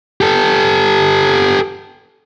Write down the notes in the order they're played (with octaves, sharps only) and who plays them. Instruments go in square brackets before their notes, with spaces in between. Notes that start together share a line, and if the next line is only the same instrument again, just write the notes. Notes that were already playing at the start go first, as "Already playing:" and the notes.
[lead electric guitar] G4 A4